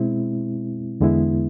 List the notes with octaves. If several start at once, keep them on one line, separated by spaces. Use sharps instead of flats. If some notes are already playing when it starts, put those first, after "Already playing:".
Already playing: B2 G#3 C4 E4
E2 D3 G#3 B3 E4